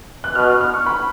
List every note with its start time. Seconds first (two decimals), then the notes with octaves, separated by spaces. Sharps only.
0.24 F#6
0.35 B2 F6
0.48 F6
0.61 F6
0.74 C#6
0.86 B5